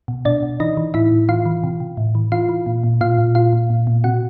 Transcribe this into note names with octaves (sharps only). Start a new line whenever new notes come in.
B2
B2 D4 D5
B2
E3 D#4 D#5
E3
A2 E4 E5
A2
E3 F4 F5
E3
C3
C3
A2
E3
E3 F4 F5
E3
A#2
A#2
A#2 F4 F5
A#2
A#2 F4 F5
A#2
A#2
A#2
C3 F#4 F#5